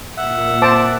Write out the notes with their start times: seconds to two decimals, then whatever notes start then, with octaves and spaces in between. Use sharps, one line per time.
0.17 A#2 E5 F#5
0.62 C5 A5 D6